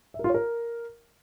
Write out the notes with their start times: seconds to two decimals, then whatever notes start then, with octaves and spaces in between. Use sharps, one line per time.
0.14 E5
0.19 A#4
0.24 F4
0.29 C#5
0.34 A#4